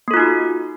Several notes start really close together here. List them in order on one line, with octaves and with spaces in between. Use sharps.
A#3 A4 F4 D#4 F#4